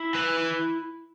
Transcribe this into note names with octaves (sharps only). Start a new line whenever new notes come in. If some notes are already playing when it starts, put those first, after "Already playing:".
Already playing: E4
E3 B4
E4